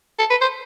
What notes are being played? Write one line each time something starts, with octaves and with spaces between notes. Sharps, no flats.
A4
B4
C5